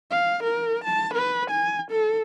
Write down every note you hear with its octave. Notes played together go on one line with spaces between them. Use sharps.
F5
A#4
A5
B4
G#5
A4